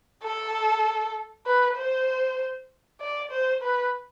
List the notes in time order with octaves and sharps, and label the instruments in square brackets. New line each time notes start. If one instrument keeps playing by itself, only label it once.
[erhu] A4
B4
C5
D5
C5
B4